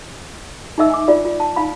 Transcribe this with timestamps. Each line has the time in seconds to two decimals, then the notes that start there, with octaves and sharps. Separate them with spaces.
0.78 D#4 G#4 D#5 E5 E6
0.90 G#5 D6
1.08 D4 F4 D5
1.25 F4
1.40 A5
1.56 D#4 F5 B5